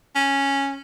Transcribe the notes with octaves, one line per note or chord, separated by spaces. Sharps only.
C#4